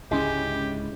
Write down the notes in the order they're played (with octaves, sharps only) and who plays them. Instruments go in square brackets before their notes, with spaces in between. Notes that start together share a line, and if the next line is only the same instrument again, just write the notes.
[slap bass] C#2 G#2 D3 [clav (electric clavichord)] G#3 [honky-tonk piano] C#4 E4 [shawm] G4